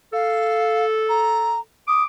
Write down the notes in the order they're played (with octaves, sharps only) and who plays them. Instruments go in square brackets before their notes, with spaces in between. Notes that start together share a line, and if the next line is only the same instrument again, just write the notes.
[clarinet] A4 [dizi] F5
[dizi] A#5
[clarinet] D6 [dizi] D#6